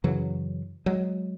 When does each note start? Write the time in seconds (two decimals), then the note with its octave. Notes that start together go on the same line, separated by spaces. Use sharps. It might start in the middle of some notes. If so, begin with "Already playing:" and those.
0.04 F#2 C#3 E3 F#3
0.86 F#3 G#3